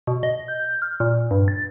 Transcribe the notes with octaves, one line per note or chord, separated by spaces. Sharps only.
B2
D#5
G6
F6
A#2
G2
A6